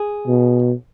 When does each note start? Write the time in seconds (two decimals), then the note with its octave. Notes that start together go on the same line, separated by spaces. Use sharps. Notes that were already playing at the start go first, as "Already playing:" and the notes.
Already playing: G#4
0.27 B2